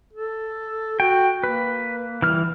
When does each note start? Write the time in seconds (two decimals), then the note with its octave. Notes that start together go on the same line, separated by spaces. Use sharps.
0.13 A4
1.00 F#4 G5
1.44 A#3 B4
2.22 E3 G3 F6